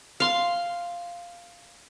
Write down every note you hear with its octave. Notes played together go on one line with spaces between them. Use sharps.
F5 C6